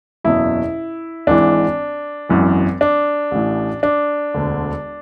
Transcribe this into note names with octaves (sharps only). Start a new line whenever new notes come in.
F#1 E2 B2 E4
G#1 G#2 E3 D4
G#1 F#2 E3
D4
A1 A2 E3
D4
E1 D2 D3